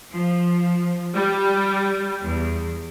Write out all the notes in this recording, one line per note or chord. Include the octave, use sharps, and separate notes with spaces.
F3
G3
E2